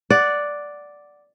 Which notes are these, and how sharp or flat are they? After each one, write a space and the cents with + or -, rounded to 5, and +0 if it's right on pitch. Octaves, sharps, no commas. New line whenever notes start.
D5 +0 F#5 +0